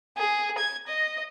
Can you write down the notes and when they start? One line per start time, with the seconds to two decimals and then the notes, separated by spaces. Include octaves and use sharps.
0.17 G#4
0.58 G#6
0.88 D#5